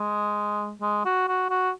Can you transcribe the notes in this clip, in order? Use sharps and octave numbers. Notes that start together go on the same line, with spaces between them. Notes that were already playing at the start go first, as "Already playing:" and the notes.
Already playing: G#3
G#3
F#4
F#4
F#4